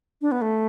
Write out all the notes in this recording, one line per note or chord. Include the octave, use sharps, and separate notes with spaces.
D4
B3
A3